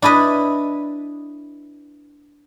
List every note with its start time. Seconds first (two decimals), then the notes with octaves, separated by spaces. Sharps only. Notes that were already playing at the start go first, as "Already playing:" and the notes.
0.02 D4 E4 B4 D#5